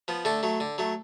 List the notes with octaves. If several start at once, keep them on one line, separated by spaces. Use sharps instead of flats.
F3 B3
D3 A3 A4
F#3 A3
D3
F#3 A3